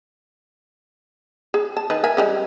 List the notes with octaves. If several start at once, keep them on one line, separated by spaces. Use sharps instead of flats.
G#4
A5
D#3 B4 G#5
A#4 E5 G#5
G3 G#3 C#4